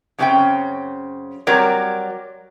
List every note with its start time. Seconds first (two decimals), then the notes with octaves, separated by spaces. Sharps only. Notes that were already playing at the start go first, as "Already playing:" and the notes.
0.19 F#2 A2 C#3 C4 C#4 G5
1.47 F#3 G3 C4 A#4 C#5 D5